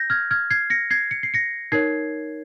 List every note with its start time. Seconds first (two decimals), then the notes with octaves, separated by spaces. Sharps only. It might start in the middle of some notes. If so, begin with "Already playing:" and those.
Already playing: G6 A#6
0.10 F6 G#6
0.31 F6 G#6
0.50 G#6 C7
0.70 A#6 C#7
0.90 G#6 C7
1.11 C#7
1.23 C7
1.34 A#6 C#7
1.72 D#4 A#4 C#5 G#6 C7